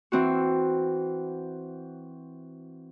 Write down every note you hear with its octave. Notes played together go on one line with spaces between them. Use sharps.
E3 C4 F#4